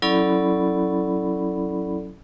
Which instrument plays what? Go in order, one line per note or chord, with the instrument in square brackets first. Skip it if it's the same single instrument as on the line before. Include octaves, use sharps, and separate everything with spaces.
[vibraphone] F#3 C#4 E4 A4 D5 B5